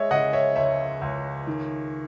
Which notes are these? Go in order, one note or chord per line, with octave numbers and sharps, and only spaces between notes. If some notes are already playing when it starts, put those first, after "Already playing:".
Already playing: G#3 C#5 D#5 E5
C#3 D#5 F#5
C#5 E5
C#2 C#5 E5
C#2
D#3